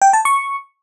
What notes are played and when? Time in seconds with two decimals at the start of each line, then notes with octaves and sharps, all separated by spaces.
0.02 G5
0.13 A5
0.25 C#6